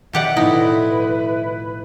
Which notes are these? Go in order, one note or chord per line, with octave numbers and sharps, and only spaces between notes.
B2 D#3 G4 B4 D5 E5 F#5
A2 F3 D#4 E4 B4